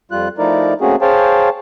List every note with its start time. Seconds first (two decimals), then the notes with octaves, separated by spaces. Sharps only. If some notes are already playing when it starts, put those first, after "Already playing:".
0.11 F2 G3 F4 F#6
0.38 F3 A3 D#4 E4 A#4 D5
0.81 A3 A#3 C4 C#4 F#4 G#4
1.02 G#4 C5 C#5 F5 G5 A5